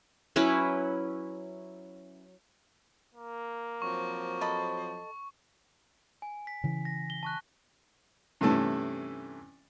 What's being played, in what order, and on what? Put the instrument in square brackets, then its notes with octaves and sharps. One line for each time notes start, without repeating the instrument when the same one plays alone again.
[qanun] F#3 C#4 E4 B4
[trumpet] A#3
[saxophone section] F3 F#3 C4 [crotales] C#6
[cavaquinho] A4 D#5 B5
[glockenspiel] G#5
B6
[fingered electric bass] C#3 E3
[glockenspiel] A#6
G7
A5 C#6 F#6
[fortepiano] G2 C3 E3 A3 C#4 A5